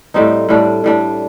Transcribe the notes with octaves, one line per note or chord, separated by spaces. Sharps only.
A2 G3 C4 D#4
A2 G3 D4
A2 G3 D4